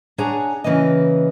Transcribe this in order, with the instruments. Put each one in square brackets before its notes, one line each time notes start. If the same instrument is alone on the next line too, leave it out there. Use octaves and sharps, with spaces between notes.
[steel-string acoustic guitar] D4 G#4 C#5 F#5 G#5 A#5
C#3 E3 A#3 B4 D#5